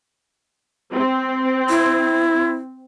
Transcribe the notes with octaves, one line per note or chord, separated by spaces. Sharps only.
C4
E4